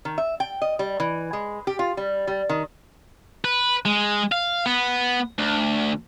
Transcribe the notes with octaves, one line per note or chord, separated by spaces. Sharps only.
D#3
E5
G5
D#5
G3
E3
G#3
G4
F4
G3
G3
D#3
B4
G#3
F5
B3
D2